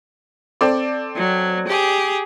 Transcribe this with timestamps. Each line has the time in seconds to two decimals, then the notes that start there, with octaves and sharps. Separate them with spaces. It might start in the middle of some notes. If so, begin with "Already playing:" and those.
0.61 C4 A4 D5
1.16 F#3
1.67 G4 G#4